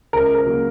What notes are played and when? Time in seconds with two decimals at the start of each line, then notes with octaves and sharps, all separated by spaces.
0.13 C#2 A#4
0.35 A#4
0.46 C#3 F#3 A#3